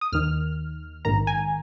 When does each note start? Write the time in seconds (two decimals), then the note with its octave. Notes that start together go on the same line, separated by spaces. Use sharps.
0.01 D#6
0.12 D#2 D#3 F6
1.05 A#1 G#2 D#3 A#5
1.27 G#5